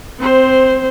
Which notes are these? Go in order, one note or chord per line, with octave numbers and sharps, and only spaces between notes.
C4 C5